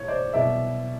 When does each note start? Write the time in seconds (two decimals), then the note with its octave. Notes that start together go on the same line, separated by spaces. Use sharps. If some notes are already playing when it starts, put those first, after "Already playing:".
Already playing: B1 A2 E3 C#5
0.08 C5 D5
0.33 C2 B2 F#3 B3 D5 E5